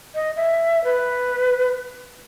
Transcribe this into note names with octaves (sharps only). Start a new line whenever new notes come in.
D#5
E5
B4